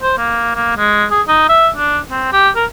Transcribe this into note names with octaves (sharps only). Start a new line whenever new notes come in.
C5
A#3
A#3
G#3
G#4
D#4
E5
D4
C4
G4
A#4